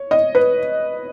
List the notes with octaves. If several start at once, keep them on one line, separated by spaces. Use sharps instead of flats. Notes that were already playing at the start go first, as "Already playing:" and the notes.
Already playing: C#5
D#5
B4